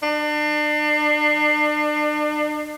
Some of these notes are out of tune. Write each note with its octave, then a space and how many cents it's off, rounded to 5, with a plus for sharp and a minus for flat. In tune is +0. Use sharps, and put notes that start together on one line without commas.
D4 +35